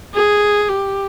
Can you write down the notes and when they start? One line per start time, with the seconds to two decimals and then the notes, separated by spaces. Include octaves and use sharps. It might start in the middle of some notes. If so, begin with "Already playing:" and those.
0.14 G#4
0.68 G4